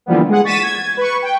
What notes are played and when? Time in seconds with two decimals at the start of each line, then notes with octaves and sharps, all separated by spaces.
0.06 D3 E3 F3 G3 A#3 B3
0.28 G#3 G#4 F#5
0.44 C#6 A6 B6 D#7 E7
0.62 G#6
0.97 B4 C#6
1.22 G5